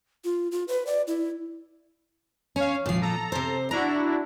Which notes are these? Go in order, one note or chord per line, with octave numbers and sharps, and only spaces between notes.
F4
F4
B4
D5
E4
C#4 C#5 F5
G#1 A#2 F3 C7
A4 A#5
C3 C5
D4 E4 F#4 A#5